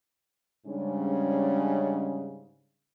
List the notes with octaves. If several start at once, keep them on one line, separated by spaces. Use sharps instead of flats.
G#2 C#3 G3 G#3 C#4 D4